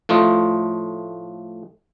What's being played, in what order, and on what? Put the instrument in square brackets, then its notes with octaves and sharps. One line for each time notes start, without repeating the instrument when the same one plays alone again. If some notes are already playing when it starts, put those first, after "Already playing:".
[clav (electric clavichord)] A2 F3 A3 F4 D#5